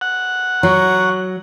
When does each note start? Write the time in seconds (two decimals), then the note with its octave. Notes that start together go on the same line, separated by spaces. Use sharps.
0.01 F#5
0.63 F#3 A#5 C#6